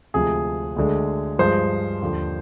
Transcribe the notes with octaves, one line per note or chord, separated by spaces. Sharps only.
D2 C3 F3 G#3 G#4
D2 D3 G#3
G2 F3 G#3 C5
D#2 D3 F3